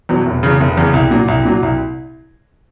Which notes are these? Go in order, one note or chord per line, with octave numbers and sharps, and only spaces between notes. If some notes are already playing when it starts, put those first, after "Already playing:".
E2 B2 F#3
F1
E2 C#3
F1
E2 C#3
C2
A#2 F#3
C2
A#2 F#3
C2